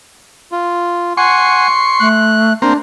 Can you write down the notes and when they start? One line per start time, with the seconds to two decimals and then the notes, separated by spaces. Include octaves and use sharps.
0.52 F4
1.17 F#5 G#5 C6 C#6
2.00 A3 F#6
2.62 A#3 C4 D4